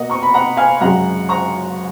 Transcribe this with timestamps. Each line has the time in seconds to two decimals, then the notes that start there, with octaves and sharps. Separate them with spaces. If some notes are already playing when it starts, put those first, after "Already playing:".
Already playing: B2 A#3 D#5 F#5
0.10 A#5 C#6
0.23 B5
0.34 F#5 A#5
0.57 F5 G#5
0.81 F#2 C#3 G#3 F#5 A#5
1.29 A#5 C#6